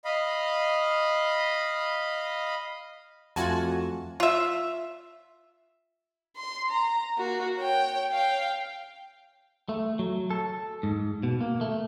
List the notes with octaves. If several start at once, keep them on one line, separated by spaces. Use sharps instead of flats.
D#5 F5 B5
F2 A3 F4 F#4 G#5 A5
F4 E5
C6
A#5
A#3 F#4
C#5 G5
F5 G5
A3
F#3
A4
G#2
B2
A#3
A3